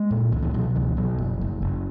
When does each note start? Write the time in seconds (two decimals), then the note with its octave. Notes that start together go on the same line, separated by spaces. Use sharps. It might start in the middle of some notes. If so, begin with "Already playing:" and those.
Already playing: G#3
0.11 A#2
0.32 C#2 E3
0.42 E3
0.54 B2 F#3
0.76 C#2 E3
0.97 B2 F#3
1.18 F#1
1.41 F#1
1.62 F#1